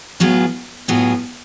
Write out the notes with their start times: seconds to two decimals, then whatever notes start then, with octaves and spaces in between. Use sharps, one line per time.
0.20 A2 F#3 B3 F4 G#4
0.88 A2 F#3 B3 F4 G#4